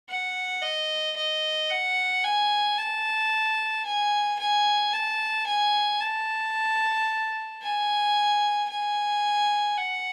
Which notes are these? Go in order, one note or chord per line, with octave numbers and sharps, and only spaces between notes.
F#5
D#5
D#5
F#5
G#5
A5
G#5
G#5
A5
G#5
A5
G#5
G#5
F#5